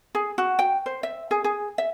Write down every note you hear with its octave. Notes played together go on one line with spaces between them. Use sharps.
G#4
F#4
G5
C5
E5
G#4
G#4
E5